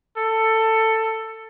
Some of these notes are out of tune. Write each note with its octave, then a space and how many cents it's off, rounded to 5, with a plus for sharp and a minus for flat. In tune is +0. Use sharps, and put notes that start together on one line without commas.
A4 +15